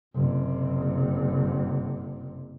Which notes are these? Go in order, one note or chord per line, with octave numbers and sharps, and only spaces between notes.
F#1 C3